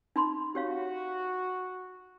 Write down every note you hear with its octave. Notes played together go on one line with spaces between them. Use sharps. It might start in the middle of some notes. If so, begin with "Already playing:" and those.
D#4 B5 C6
F#4 G4 C#5 F5